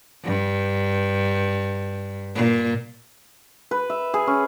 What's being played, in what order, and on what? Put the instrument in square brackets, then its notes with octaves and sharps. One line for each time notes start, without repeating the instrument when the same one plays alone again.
[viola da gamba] G2
A#2
[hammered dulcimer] B4
E5
G#4
C#4